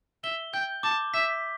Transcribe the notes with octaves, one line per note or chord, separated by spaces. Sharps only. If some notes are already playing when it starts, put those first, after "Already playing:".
E5 G7
G5 G6
A5 D6
E5 B6